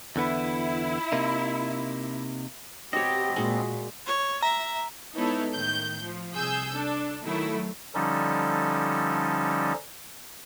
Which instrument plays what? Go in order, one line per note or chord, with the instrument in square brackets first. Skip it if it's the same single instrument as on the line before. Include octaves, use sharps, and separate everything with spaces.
[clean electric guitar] E2 D3 B3 [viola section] E4
[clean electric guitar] C3 A#3 D#4
[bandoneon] B2 B3 C4 [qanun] F#4 C#5 [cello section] G4 [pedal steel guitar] D#5
[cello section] A#2 [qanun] G#3 F#4
[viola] C#5
[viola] E5 [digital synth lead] A#5
[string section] G#3 B3 D#4 E4 A4 C#5
A2 D#3 G6
F3
C2 G#4 E6 G6
D4 A4
D#3 F#3 A3 E4
[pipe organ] D3 F3 G3 C#4 D#4 A4